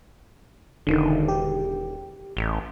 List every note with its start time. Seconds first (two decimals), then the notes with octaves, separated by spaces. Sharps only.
0.87 E1 D3 D#3
1.28 G4
2.37 A1